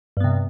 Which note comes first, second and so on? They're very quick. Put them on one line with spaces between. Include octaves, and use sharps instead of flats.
G2 B3 C3